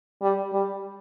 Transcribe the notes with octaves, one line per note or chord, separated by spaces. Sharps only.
G3
G3